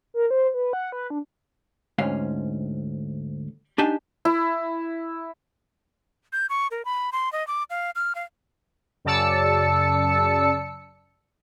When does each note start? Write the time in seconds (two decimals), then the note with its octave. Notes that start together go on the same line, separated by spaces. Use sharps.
0.14 A#4
0.31 C5
0.54 B4
0.73 F#5
0.92 B4
1.10 D4
1.98 D2 G#2 C#4 F5
3.78 D4 D#4 G4 G#5 A5
4.25 E4
6.33 G6
6.50 C#6
6.71 A#4
6.85 B5
7.12 C6
7.32 D#5
7.47 D6
7.70 F5
7.96 F6
8.15 F5
9.05 F#2 C#3 D5 A5 E6 C#7